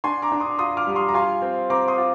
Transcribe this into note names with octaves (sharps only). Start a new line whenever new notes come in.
D4 G#5 C6
A#5 D6
D4
C6 D#6
F4 C6 D#6
D6 F6
G3
C6 D#6
A#5
F4 G#5 C6
C4
C4 A#5 D6
C6 D#6
F4